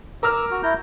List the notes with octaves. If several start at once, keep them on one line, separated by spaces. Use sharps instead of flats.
A#4 D6 E6 F6
F#4
E4 A#5 G6